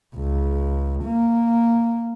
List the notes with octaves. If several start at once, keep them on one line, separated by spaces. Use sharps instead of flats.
C#2
A#3